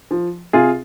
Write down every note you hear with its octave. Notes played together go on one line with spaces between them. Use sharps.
F3
C3 F4 G#4